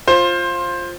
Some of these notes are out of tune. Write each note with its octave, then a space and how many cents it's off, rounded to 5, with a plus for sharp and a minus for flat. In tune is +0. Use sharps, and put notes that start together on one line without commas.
F4 +0 C5 +20